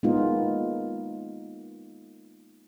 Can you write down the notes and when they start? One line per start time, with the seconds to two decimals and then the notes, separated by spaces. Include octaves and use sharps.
0.03 G#3 A#3 B3 D#4 F4